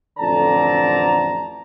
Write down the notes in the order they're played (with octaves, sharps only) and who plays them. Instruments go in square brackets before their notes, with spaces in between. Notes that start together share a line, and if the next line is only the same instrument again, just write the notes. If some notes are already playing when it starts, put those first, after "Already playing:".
[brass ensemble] A1 F2 D3 D5 A5 A#5